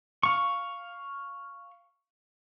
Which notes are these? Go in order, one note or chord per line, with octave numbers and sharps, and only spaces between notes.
F5 C#6